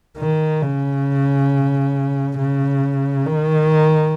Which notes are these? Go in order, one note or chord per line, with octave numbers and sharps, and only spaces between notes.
D#3
C#3
C#3
D#3